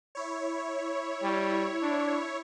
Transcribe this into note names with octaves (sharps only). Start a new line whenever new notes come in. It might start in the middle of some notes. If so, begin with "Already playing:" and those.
E4 C#5
G3
D4